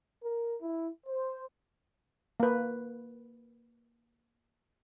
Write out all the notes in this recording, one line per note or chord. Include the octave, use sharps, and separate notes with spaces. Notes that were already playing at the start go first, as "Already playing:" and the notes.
A#4
E4
C5
A#3 B4